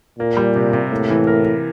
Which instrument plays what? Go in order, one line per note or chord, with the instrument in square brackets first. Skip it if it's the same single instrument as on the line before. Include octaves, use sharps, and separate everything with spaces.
[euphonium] A#2 [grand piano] A#3
[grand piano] G3
C3
C3
[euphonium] A2 [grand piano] A#3
[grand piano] E3
A#4
A#4